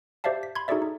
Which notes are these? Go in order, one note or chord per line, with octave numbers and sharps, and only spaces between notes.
G4 C5 D5 E5 F5 A5
B6
B5 C6 G#6
D#4 F#4 G#4 A4 D5 E5
D#4